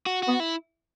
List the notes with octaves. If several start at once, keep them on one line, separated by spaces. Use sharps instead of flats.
F#4
F#4
B3
E4